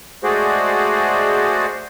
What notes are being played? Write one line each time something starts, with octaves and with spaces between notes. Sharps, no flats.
G#3 A3 F#4 G#4 C5 D5